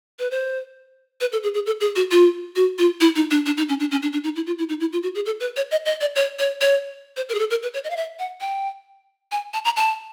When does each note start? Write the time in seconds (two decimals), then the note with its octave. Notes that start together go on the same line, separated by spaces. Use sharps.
0.19 B4
0.31 C5
1.21 B4
1.32 A4
1.43 G#4
1.54 G#4
1.66 A4
1.81 G#4
1.96 F#4
2.11 F4
2.56 F#4
2.79 F4
3.01 E4
3.16 D#4
3.31 D4
3.46 D4
3.57 D#4
3.69 C#4
3.80 D4
3.91 C#4
4.02 D4
4.13 D4
4.24 D#4
4.36 E4
4.47 F4
4.58 E4
4.69 D#4
4.80 E4
4.93 F4
5.03 F#4
5.15 G#4
5.26 A4
5.40 B4
5.56 C#5
5.71 D#5
5.86 D#5
6.01 D5
6.16 C#5
6.39 C#5
6.61 C#5
7.17 C5
7.29 A#4
7.35 G#4
7.39 A4
7.50 A#4
7.63 B4
7.74 C#5
7.84 D#5
7.90 F5
7.97 E5
8.19 F#5
8.41 G5
9.32 G#5
9.54 A5
9.65 A#5
9.76 A5